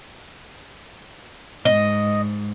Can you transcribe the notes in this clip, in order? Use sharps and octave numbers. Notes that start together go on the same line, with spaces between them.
G#2 D#5